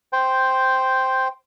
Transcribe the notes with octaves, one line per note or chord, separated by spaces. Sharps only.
C5 G5